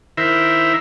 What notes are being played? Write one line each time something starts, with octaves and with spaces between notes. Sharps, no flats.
D#3 E4 A#4 C5 E5